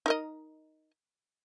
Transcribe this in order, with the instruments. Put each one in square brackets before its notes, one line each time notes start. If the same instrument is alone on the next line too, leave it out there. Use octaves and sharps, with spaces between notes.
[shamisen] D#4 A#4 D#5